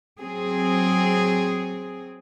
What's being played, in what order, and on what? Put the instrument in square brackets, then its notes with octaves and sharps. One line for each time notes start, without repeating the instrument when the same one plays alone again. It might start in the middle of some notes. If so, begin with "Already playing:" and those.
[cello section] F#3 C4 G#4